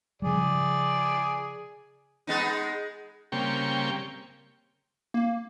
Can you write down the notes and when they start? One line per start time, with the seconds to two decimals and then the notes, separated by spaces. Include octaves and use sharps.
0.22 C#3 F3 G3 G#4 D5
2.27 G#3 B3 D#4
3.32 C#3 G3 A#3 C4 G5 C#6
5.14 A#3